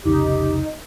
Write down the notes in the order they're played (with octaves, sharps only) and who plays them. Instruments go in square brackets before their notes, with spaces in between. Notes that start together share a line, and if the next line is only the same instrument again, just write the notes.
[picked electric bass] F1 C2 C#3 [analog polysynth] D#4 [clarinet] G4